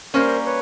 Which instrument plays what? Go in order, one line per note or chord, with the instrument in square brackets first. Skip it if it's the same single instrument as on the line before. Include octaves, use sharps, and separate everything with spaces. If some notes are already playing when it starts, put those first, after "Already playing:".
[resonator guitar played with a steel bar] G3 A#3 C#4 [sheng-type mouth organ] A#4 C5
[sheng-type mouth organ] B4 C#5